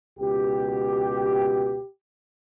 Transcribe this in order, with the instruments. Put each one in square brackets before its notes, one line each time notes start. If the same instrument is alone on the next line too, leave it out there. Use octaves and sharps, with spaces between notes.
[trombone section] C#2 B2 G4